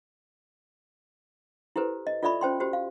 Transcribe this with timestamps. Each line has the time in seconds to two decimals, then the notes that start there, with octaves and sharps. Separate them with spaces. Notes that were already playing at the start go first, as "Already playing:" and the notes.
1.76 E4 G4 A4 B4 C5
2.07 D#5
2.23 F4 A4 D5 E5 B5 C#6
2.41 C#4 C5 G5 C6
2.60 F#4 G4 C5
2.73 F5